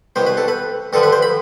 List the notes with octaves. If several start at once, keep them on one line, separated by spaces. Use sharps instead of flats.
C2 B2 G3 C5
B4
A4
B4
G2 D3 F3 A4
B4
C5
B5